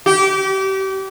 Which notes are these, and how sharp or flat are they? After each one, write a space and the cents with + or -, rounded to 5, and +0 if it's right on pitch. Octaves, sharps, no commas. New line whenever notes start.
G4 -30